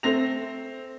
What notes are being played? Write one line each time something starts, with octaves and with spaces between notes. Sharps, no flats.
A3 C4 A#6 F7